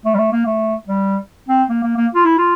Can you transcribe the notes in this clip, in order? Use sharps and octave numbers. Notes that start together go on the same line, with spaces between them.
A3
G3
A3
A#3
A3
G3
C4
A#3
A#3
A#3
F4
E4
F4